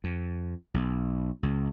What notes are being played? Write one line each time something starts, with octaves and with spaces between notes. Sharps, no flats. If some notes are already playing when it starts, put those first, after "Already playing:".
F2
B1
C#2